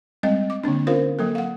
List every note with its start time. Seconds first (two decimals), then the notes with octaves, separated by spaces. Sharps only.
0.23 G3 G#3 C4 D#5
0.50 D6
0.64 D3 A#3 C4 D4
0.87 C#4 F4 A#4 C5 F5
1.19 F#3 A#3 A4
1.35 F5 F#5